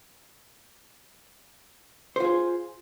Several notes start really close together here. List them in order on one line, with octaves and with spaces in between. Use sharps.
C5 F4 G#4